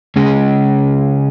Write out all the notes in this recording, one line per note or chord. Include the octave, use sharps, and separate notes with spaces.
C#3 G#3 C#4 G#4